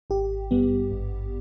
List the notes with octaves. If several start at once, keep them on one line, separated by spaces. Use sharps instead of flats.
G#1 G4
G2 G3 B3
G#1